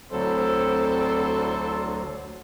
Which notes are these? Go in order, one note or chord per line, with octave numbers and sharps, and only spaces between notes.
D2 F#3 C4 D4 E4 A4 C5